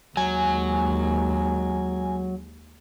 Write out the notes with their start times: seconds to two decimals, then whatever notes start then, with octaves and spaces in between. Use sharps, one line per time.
0.17 D#2 F#3 G#3 G#5